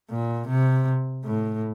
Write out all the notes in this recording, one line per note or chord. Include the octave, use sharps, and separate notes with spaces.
A#2
C3
A2